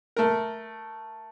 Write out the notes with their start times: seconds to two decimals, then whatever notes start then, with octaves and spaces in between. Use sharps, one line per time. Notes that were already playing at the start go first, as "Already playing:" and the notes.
0.16 A3 A#4